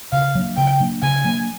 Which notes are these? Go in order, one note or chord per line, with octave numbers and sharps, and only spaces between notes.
C#3 F5
F#3 A#3 D4
C#3 G5
F#3 A#3 D4
C#3 G#5
F#3 A#3 D4